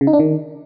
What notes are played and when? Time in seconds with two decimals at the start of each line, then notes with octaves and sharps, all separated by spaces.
0.01 C#3
0.07 D#4
0.13 D4
0.19 D#3